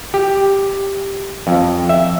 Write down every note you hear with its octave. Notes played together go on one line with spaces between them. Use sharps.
G4
F2
E5